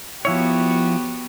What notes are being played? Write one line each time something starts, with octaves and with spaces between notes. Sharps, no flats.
F3 B3 E4 F#4 G4 C#5